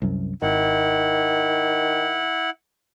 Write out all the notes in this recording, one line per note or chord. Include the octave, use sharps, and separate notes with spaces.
C2 F#2
G#1 D#3 E4 F#5